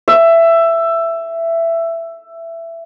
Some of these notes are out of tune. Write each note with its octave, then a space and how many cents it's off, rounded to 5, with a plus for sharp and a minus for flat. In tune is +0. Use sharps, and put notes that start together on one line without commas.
E5 +15